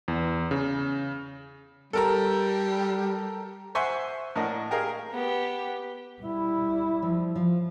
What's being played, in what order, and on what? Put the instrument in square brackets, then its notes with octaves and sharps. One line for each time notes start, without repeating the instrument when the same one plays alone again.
[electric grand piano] E2
C#3
[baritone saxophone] G3 [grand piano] A4 A#4 A#5
[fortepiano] C5 E5 F#5 G#5 C6 C#6
A2 D4 A#4 D#5 F#5
G4 G#4 A#4 D#5 F5
[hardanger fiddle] B3 G4
[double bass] G3 E4
[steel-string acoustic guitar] F3
F3 F4